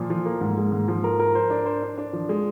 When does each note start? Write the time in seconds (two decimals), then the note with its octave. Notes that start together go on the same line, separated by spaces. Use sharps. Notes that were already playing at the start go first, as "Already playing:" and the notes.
Already playing: A#2 F3
0.10 F3
0.26 A#3
0.41 G#2
0.57 G#3
0.72 G#2
0.88 F3
1.04 A#4
1.19 A#4
1.35 C5
1.50 D4
1.66 C5
1.82 D4
1.98 D4
2.13 F3
2.29 G#3